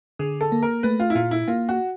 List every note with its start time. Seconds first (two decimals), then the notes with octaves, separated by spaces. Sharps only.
0.19 D3 G#4
0.41 A4
0.52 A#3
0.62 A#4
0.83 A3 B4
1.00 F4
1.10 E4
1.15 A#2 F4
1.31 E4
1.48 A#3 F4
1.69 F#4